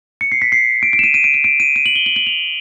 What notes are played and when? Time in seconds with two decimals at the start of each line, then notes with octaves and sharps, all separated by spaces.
0.21 C#7
0.32 C7
0.42 B6
0.52 C7
0.83 D7
0.93 D7
0.99 E7
1.03 D#7
1.14 D#7
1.24 D7
1.34 D#7
1.44 D7
1.60 D#7
1.76 D#7
1.86 F#7
1.96 G7
2.06 F#7
2.16 F#7
2.27 F7